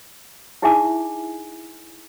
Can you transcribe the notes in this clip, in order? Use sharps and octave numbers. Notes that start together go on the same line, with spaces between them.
D#4 E4 G#4 E5 G#5 D6